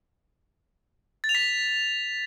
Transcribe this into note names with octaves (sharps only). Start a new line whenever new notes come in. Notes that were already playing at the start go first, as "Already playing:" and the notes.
A6
F7
B6